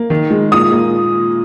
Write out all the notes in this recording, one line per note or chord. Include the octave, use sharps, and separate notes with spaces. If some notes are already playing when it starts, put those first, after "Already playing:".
Already playing: A#3
D#3
G#3
A#2 D#6
A#3